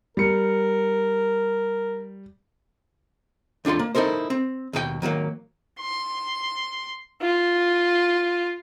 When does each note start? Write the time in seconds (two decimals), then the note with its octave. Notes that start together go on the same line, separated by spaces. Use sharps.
0.17 G3 A#4 C#7
3.65 D#2 D4 F4 A4 C6
3.79 A#3
3.95 D#4 E4 A4 A#4 C5
4.30 C4
4.73 D#2 B2 A4 G5
5.02 D#3 F#3 A3 A#3
5.81 C6
7.22 F4